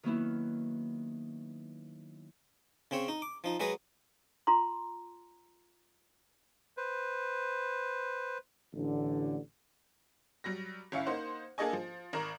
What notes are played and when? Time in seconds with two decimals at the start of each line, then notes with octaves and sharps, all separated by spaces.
0.03 D#3 F#3 A#3 B3 C#4 E4
2.91 C#3 C4 C#5
3.08 D#4
3.22 D6
3.44 F3 D#4
3.60 F#3 G#3 G#4 B4 D#5
4.47 F4 A#5 C6
6.77 B4 C5
8.74 A1 D3
10.44 F#3 G3 A#6
10.92 G1 C#4 E4 F5 C#7
11.06 A#3 D#4 C5 F#5
11.58 A#3 D4 G#4 A4 D#5 G#5
11.73 F3
12.13 G#1 A#4 A#5 E7